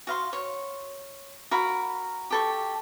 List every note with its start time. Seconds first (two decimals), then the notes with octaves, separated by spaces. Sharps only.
0.07 F#4 F5 C6
0.33 C#5
1.51 F#4 A#4 F5 B5
2.30 G4 A4 C#6